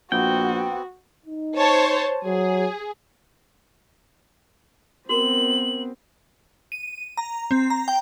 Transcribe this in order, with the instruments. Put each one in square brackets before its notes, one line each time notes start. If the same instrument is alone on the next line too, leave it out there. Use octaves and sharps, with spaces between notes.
[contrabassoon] A#1 [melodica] B3 C4 [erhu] F#4 [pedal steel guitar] G5
[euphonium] D#4
[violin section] C5 C#5 A5
[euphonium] F#3 [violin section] G#4
[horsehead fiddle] B3 C4 [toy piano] F#4 A#4 [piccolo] F#7
[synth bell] D#7
A#5
C4
A#5
G5